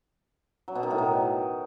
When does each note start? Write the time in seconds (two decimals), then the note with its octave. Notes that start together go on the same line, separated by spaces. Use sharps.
0.68 F#3
0.75 B2
0.83 D#3
0.91 A2
0.98 D#3